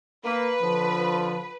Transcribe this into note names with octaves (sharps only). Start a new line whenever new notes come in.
A#3 B4
D3 F3